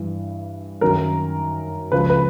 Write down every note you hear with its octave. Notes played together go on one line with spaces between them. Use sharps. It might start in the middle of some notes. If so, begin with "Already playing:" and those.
Already playing: G2 E3
F#2 D#3 F#3 A#4
C#2 C#3 F3 B4
B4